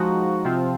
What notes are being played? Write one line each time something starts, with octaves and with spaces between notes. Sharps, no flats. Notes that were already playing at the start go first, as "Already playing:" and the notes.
Already playing: F3 G#3 D#4 F#4
C3 F3 C4 F4